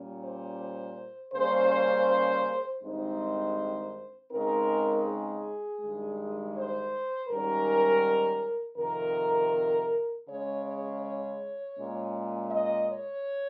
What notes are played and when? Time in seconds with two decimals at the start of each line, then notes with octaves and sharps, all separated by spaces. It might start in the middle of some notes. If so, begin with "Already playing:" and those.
Already playing: A#2 G3 C#4
0.23 C5
1.34 C#3 G3 A#3 C#4 C5
2.82 G2 D#3 G#3 C4 D#4 C5
4.31 C#3 G#3 C4 D#4 A#4
5.06 G#4
5.81 G2 D#3 G#3
6.55 C5
7.29 G#2 D#3 G3 C#4 A#4
8.78 F2 C3 D#3 A#4
10.26 C#3 G#3 C#4 C#5
10.63 C#5
11.01 C#5
11.76 A#2 G#3 C#4
12.50 D#5
12.87 C#5